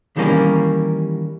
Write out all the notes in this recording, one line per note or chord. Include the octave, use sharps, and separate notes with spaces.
D#3 E3 G3 A#3 C#4 A#4